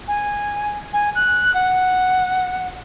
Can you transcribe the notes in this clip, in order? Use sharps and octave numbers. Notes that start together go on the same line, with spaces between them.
G#5
G#5
F#6
F#5